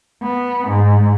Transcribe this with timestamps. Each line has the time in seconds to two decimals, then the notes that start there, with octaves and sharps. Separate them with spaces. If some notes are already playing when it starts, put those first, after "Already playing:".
0.23 B3
0.69 G#2